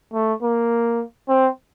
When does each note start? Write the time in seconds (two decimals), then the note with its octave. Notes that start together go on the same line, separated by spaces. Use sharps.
0.13 A3
0.42 A#3
1.29 C4